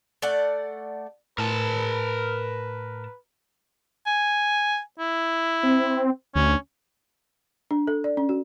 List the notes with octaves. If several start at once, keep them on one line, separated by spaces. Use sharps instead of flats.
A3 D5 F#5
A2 A#4 B4 A5
G#5
E4
C4
D2 C#4
D4
A4
D5
C#4
F#4